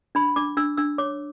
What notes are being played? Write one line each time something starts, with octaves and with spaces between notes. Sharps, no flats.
D4 B5
D4 D6
D4 E6
D4 E6
C#5 D6